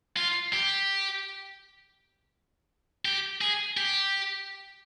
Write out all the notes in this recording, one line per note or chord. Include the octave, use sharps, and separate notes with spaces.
F4
G4
G4
G#4
G4